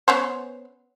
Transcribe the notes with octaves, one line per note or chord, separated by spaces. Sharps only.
B3 C#4 C5